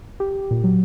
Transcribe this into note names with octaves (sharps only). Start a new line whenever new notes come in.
G4
A#2
F#3